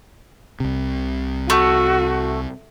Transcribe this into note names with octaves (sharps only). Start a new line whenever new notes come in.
C2 C3
A3 F#4